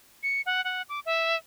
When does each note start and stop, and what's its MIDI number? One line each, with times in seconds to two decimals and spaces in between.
0.23 0.41 97
0.46 0.63 78
0.64 0.82 78
0.89 1.00 86
1.06 1.36 76